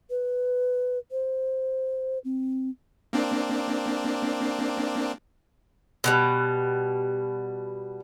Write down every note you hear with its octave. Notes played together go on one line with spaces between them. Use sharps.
B4
C5
C4
A#3 C4 D4
B2 D3 G3